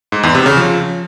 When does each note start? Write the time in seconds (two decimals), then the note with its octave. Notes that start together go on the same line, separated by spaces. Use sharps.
0.12 G#2
0.23 E2
0.35 C3
0.46 C#3
0.57 F3